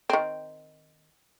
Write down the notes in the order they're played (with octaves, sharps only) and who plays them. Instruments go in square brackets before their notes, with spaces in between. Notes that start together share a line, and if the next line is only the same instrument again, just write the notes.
[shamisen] D#3 C4